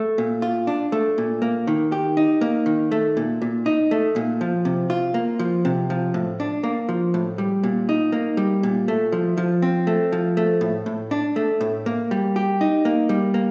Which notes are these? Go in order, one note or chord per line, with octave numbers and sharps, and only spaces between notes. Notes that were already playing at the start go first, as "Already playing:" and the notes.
Already playing: A3
A#2
F4
D4
A3
A#2
A#3
D#3
G4
D#4
A#3
D#3
A3
A#2
A#2
D#4
A3
A#2
F3
C3
F4
A#3
F3
C3
F3
A2
D4
A#3
F3
A2
G3
A#2
D#4
A#3
G3
A#2
A3
F3
F3
C4
A3
F3
A3
A2
A2
D4
A3
A2
A#3
G3
G4
D#4
A#3
G3
A#3